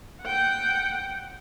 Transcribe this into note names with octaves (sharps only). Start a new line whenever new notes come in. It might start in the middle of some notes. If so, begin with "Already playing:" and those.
F#5 G5